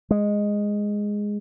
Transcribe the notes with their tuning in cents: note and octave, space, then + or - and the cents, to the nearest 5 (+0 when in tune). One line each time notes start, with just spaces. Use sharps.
G#3 -5